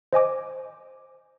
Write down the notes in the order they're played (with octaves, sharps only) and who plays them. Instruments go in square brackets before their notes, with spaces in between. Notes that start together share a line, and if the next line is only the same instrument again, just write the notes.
[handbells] C5 D#5 G#5 D6